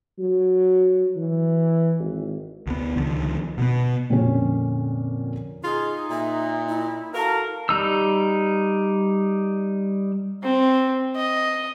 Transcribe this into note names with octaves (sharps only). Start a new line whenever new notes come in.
F#3
E3
G#1
D2 B3
C#2 D3 D#3 F3
B2 B3
F2 A#2 D3 C#4
D#4 F4 G#4
A#2 E5
E4
F#4 A4 A#4 F5
G3 D#4 E6
C4
D#5